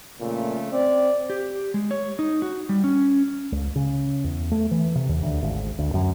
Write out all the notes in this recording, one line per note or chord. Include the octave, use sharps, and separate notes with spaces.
F2 A#2 C#3 A3
C4 D5
G4
G#3
C#5
D#4
F#4
G3
C#4
C#2
C#3
E2
A3
E3
C3
D#2
D2
G#1
D2
F#2